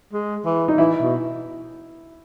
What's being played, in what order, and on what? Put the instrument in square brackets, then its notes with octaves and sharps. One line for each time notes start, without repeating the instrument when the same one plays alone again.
[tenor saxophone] G#3
E3
[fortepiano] D#4
[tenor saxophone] E3 [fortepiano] E4
[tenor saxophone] B2